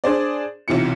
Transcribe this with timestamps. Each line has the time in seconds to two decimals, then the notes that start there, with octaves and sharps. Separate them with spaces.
0.04 D4 G#4 C5 D5
0.68 B1 C3 E3 F4 C#7